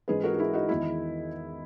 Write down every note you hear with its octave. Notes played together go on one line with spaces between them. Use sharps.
G#2 E3 G#3 C#4 G#4 B4
F#4 A#4
F#4
E4 G#4
D#4 F#4
E2 D#3 G#3 D#4 E4